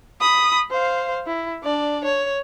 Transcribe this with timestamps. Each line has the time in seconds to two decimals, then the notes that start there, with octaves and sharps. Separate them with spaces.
0.21 B5 D#6
0.71 C5 F5
1.26 E4
1.63 D4 D5
2.04 C#5